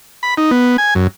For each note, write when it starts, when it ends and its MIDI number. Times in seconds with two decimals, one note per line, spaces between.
0.23 0.34 83
0.37 0.51 63
0.51 0.77 59
0.78 0.94 80
0.95 1.07 42